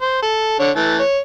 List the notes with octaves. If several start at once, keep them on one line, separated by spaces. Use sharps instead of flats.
C5
A4
D3 C#5
E3 A3 A5
C#5